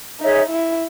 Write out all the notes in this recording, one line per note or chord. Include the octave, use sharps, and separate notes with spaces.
D#4 G#4 C#5 E5
E4